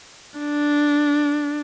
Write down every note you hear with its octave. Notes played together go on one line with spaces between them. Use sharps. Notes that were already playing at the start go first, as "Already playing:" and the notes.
D4